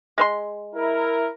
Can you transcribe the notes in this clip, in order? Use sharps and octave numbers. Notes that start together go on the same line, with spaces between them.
G#3 B4 C6
E4 A#4